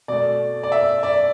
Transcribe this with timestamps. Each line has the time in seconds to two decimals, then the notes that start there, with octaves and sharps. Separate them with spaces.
0.08 B2 A3 D5
0.63 D5
0.72 E5
1.03 D5